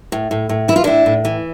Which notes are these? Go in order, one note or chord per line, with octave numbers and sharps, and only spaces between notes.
A2
A2
A2
E3 E4
F4
A2 D4 E4
A2
E3